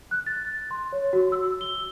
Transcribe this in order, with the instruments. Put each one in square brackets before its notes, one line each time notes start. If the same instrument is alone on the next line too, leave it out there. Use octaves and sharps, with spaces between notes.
[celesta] F#6
A6
C6
C#5
F#4
E6
G7